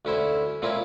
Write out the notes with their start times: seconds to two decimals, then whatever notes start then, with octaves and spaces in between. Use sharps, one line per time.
0.05 D2 C#4 E4 C5
0.62 A#2 C4 C#4 E4 F4